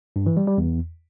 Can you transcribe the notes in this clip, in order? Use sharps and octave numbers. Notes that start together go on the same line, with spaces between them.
G2
E3
G3
G3
E2